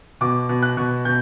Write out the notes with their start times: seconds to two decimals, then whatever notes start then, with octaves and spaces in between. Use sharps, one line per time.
0.21 B2 D6
0.49 B2
0.63 F#6
0.77 B2
1.05 B2 G6